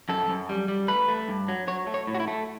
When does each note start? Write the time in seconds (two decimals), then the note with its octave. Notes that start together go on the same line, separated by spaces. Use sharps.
0.09 F#2 A4
0.29 F#2
0.49 G3
0.68 G3
0.88 A3 B4
1.08 A3
1.28 G2
1.48 F#3
1.68 F#3 C#5
1.87 A3
1.94 C#5
2.07 A2
2.15 F#4
2.20 E4
2.28 A3